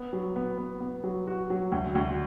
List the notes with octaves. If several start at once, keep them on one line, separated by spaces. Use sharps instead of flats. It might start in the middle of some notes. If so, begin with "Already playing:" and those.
Already playing: B3
F#3
B3
B3
B3
F#3
F#4
F#3
D2
D2